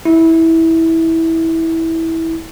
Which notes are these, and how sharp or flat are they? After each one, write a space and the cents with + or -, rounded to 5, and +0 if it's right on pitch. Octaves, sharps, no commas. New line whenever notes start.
E4 -15